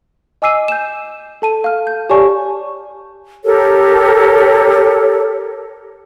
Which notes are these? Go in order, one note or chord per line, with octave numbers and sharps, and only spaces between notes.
D#5 G#5 D6 E6 C7 D#7
G6 E7
A4 A5 D#7
F5 F6
G6
G4 C#5 D5 G#5 A5 C#6
G4 A4 A#4 C#5